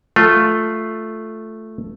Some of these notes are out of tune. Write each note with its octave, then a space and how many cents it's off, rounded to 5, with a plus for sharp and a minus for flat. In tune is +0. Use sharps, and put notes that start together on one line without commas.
A3 +0 F4 +0